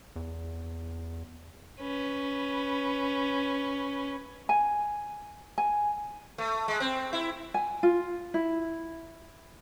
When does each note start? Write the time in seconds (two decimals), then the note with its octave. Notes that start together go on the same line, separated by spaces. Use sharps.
0.16 E2
1.80 C#4 B4
4.49 G#5
5.58 G#5
6.38 A3
6.68 G#3
6.80 C4
7.13 E4
7.54 G#5
7.83 F4
8.34 E4